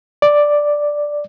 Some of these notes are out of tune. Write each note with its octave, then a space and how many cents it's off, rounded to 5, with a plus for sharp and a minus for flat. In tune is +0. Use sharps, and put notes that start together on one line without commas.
D5 +0